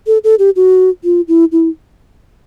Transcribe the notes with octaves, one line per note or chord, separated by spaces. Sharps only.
A4
A4
G4
F#4
F4
E4
E4